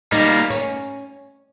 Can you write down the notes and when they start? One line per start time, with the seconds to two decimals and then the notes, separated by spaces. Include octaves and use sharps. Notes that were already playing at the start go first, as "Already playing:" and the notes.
0.12 G3 A#3 D#4
0.50 C#4